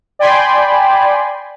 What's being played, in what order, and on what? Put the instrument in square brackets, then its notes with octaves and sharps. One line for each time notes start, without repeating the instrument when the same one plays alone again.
[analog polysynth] D5 G5 G#5 B5 C6